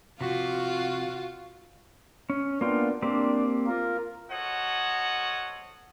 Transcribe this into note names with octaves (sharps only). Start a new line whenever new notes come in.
C3 F3 F4 F#4
C#4
A#3 B3 D4 F4 G5
A#3 C4 D4 G4
F4 A#4
F#4 A4 C5 C#5 D#5 F#5